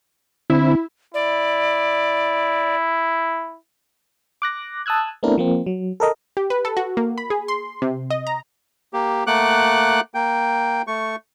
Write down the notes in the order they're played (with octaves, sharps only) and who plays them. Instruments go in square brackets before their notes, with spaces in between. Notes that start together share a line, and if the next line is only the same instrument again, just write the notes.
[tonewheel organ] D3 C4 [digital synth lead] E4
[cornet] E4 [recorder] D5
[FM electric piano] D6 F#6 A#6
A5 D#6 E6 F#6 G#6
A3 B3 C4 D4 E4 A#4
F3 A#3 C4
F#3
A4 A#4 D#5
[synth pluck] G4
B4
A4
F#4
A#3
B5
G#4
C6
C3
D#5
A#5
[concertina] A#3 G4
A3 A#3 F#5 D6 F#6
A#3 G5
A3 C#6